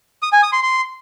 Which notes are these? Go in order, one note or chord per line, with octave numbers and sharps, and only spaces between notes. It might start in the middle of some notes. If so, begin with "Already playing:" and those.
D#6
G#5
D#6
C6
C6